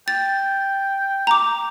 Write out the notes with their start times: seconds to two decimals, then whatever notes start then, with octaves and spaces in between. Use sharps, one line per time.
0.08 G5 A6
1.27 A#5 D6